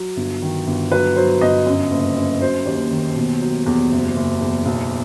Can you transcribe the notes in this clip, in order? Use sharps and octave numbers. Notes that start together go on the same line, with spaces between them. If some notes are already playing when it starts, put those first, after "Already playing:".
Already playing: F#3
G1
D#3
G1
F#3 B4
F#3 C5
G1 D#5
F#2
F#1
F#2
F#3 C5
D#2
D#3
B2
F#3
E2
F#1
F#1
E2
B1